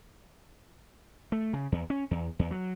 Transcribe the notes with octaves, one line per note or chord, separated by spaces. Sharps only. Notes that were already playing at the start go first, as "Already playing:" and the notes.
A3
C#3
E2
C#4
E2
E2
F#3